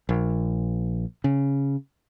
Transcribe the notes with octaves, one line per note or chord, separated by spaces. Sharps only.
A#1
C#3